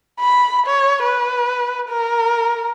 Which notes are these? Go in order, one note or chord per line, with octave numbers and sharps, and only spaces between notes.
B5
C#5
B4
A#4